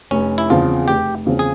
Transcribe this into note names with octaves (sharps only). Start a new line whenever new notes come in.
F1 C#4
E4
E2 C#3 F3 C4 F4
F1 G4
E2 C#3 F3 C4
G#4